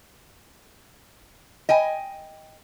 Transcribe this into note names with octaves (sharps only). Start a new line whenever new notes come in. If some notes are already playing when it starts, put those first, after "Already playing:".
D#5 G5 G#5